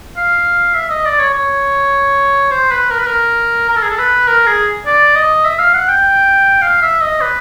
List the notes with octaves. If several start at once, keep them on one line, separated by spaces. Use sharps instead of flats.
F5
E5
D#5
D5
C#5
C#5
C5
B4
A#4
B4
A#4
A#4
A4
G#4
A4
B4
A#4
G#4
D5
D#5
E5
F5
F#5
G5
F5
E5
D#5
B4